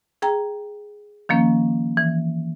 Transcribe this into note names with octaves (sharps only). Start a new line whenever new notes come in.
G#4 G5 A#5
D#3 F3 A#3 C#4
E3